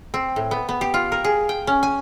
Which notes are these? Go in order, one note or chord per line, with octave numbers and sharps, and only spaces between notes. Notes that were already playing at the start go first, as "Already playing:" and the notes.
C4
A2
B3
B3
G4
F4
A#4
G#4
G5
C#4
G#5